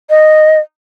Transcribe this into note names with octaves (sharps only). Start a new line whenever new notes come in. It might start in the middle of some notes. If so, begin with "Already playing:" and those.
D#5